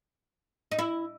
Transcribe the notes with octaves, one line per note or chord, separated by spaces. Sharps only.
D#4
E4